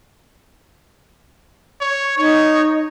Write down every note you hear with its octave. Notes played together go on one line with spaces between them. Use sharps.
C#5
D#4 C#5